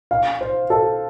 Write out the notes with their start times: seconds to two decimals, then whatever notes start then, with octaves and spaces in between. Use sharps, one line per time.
0.11 F5
0.41 C5
0.70 A4